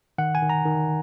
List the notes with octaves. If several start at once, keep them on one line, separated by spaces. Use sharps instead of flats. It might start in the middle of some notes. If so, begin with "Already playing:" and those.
D#3 F#5
G#5
D#3
A#5
D#3